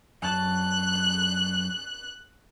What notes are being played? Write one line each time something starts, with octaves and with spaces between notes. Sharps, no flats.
F#2 A5 F#6